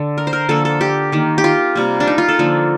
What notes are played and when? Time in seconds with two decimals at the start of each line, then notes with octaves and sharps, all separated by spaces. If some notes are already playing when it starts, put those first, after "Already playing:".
Already playing: D3
0.18 A#4
0.27 C5
0.33 A#4
0.49 D3 F3 A#3 A4
0.65 A4
0.81 G4
1.12 D#3 A#3
1.38 G4
1.44 F4
1.75 C3 G3 A#3
2.00 D4
2.07 D#4
2.18 F4
2.29 A4
2.39 D3 F3 A#3